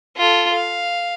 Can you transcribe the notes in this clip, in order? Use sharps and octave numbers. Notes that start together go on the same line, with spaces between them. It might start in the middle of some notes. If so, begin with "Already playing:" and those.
F4 A4
F5